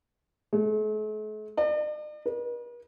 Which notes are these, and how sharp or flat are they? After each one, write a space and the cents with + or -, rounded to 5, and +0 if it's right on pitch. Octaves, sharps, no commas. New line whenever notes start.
A3 -45
D5 +45
B4 -45